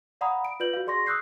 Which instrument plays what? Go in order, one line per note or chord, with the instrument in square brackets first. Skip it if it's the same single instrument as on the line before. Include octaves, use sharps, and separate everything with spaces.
[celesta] D5 F5 F#5 A#5 B5 D#6
D7
F4 B4 D5 G6 F#7
F#4 F5
G#4 D5 C6 C#6 A#6
C#6 D#6 E6 F#6 G6 C7